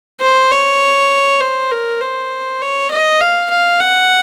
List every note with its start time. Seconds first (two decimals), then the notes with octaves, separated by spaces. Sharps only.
0.21 C5
0.51 C#5
1.40 C5
1.71 A#4
2.01 C5
2.61 C#5
2.91 D#5
3.20 F5
3.50 F5
3.80 F#5